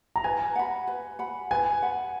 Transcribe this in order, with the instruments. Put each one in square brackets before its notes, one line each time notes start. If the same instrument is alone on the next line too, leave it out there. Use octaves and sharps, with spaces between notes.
[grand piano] A#5
[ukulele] B4 [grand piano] G#5
[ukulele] F#5 B5
B4
F#5 B5
[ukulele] B4 [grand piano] G#5
[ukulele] F#5 B5